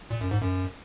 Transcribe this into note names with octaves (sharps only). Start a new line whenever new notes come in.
A#2
F#2
G#2
F#2